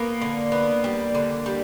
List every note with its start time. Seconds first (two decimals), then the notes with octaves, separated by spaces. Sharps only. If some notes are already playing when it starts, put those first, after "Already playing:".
Already playing: A#3 B3
0.22 D3
0.52 B3
0.84 G3
1.15 D3
1.46 G3